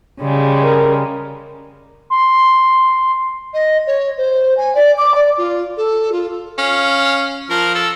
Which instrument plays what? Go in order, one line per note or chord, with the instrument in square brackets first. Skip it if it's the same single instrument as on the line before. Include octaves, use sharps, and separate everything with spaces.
[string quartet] C#3 G3 G#3
[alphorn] A#4
[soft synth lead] C6
[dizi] D#5
C#5
C5
G#5
D5
D6
D5
F4
A4
F4
[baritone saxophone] C#4 [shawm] F5
[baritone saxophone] F3 [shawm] A#4
[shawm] A4